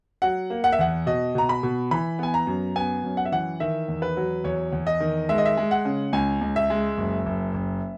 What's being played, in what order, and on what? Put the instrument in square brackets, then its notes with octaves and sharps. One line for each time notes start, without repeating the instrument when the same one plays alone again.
[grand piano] F#3 F#5
A#3
F#5
E5
E2 F#5
B2 D#5
B2 A#5
B5
B2
E3 B5
B3 G#5
A#5
F#2
B3 G#5
F#2
F#5
E5
E3 F#5
D#3 E5
E2
B4
F#3
E2 C#5
E2
D#5
D#3
G#3 E5
D#5
E5
G#3
F#5
C#3
C#2 G#5
C#2
E5
G#3
F#1
F#1
F#1